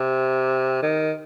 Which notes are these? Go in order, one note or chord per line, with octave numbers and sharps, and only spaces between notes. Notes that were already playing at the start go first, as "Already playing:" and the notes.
Already playing: C3
D#3